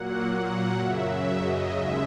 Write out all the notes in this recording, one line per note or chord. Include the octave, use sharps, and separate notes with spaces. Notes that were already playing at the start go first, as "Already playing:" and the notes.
Already playing: A#2 F#3 A#3 F#5
F#5
F#2 C#3 F#3 E5
E5
D#5
D#2 C#3 G#3 E5